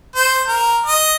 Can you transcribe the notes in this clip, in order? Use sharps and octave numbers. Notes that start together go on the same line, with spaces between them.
C5
A#4
D#5